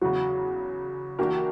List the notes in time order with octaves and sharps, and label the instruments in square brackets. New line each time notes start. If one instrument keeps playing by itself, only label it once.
[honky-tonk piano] E2 C#3 F#3 [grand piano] F#4
[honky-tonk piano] E3 A#3 D4 G4 A#4 [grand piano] F#4